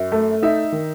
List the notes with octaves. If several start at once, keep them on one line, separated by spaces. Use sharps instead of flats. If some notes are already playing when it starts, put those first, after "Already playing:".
Already playing: F#2
A3
D#4 E5
D#3